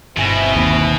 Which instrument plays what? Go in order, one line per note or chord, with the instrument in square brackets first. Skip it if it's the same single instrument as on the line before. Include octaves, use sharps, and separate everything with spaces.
[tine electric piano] G1 G#5 A#6 [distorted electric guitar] B2 [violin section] C4 E4
[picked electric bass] D#2